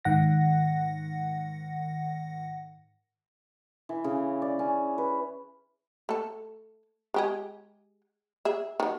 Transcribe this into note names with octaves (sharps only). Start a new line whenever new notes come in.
G#2 D#3 F#5 A#6
E3
C#3
D5
C#4
B4
A3 A4
G#3 G4 G#4
G#4 E5
D#3 F#3